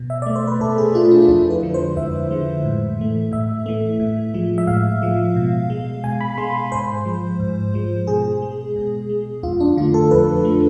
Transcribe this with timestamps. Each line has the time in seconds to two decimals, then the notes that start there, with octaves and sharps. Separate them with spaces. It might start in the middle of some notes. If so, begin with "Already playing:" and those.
Already playing: B2
0.10 E5
0.22 A3 D5
0.36 C5
0.47 B4
0.61 B2 A4
0.78 G#4
0.94 A3 F4
1.11 D4
1.22 D4
1.28 F2 E4
1.50 B4
1.63 D3 F3 G#3
1.74 C5
1.96 F2 E5
2.31 D3 F3 G#3
2.65 A2
2.99 E3 A3
3.32 A2 E5
3.66 E3 A3
3.99 A2
4.34 F3 G#3
4.58 E5
4.67 A2 F5
5.02 F3 G#3
5.36 B2
5.70 G#3
6.04 B2 G#5
6.21 B5
6.38 G#3 C6
6.54 B5
6.72 G#2 C5
7.05 F3 G#3
7.40 G#2
7.74 F3 G#3
8.07 B2 G#4
8.42 G#3
8.76 B2
9.09 G#3
9.43 F2 F4
9.60 D4
9.77 D3 A3 F4
9.94 A4
10.11 F2 B4
10.45 D3 A3